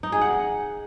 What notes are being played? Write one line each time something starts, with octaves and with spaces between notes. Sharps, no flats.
D#4
G#4
F#5